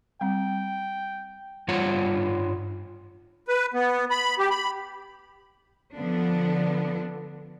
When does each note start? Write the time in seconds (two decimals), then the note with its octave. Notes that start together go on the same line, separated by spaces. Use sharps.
0.21 G3 C4 G5
1.68 G2 G3 F4 C#5 F#5
3.48 B4
3.74 B3
4.11 B5
4.39 G4
4.50 B5
5.95 D3 F3 B3 D4